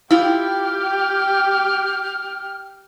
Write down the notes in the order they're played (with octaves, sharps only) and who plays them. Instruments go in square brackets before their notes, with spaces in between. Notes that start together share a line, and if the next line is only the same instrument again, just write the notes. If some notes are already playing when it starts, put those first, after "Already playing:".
[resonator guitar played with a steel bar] E4 F4 [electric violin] G4 G5 [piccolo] F6